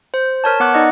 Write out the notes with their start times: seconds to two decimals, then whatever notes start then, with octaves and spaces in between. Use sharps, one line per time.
0.14 C5
0.44 A#4 C#5 A5
0.60 B3 F#5 D6 F#6
0.74 D#4 D5 D#5